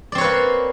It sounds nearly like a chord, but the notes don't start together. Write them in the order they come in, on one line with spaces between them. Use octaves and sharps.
D5 C4 C#5 B4 A#3